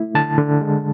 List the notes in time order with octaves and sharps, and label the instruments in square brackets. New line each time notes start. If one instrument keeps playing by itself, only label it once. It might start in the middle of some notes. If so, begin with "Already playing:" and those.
Already playing: [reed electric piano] A3 E4
D3 A5
D3
G#3